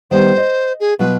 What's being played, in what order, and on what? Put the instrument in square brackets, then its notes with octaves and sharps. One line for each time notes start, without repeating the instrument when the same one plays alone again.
[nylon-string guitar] D#3 G3 B3 [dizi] C5
[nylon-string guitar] D#5
[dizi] G#4
[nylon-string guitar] B2 F#3 F4 [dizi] B4